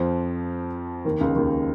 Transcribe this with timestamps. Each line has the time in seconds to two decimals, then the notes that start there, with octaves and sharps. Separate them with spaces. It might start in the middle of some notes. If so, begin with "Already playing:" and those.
Already playing: F2 F3
1.05 D#2 D#3
1.20 C#2 C#3
1.36 D#2 D#3